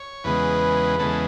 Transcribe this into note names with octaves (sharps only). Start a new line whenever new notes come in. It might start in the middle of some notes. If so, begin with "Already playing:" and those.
Already playing: C#5
E2 C#3 G#3 B3 B4
E2 C#3 G#3 B3 A4